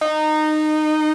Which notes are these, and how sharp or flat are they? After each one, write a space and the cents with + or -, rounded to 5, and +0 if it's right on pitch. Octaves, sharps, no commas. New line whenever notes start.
D#4 -20